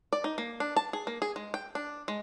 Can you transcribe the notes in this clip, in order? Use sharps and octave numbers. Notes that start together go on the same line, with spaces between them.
D5
D#4
A#3
D4
A5
G#4
A#3
G#4
G#3
G5
D4
G#3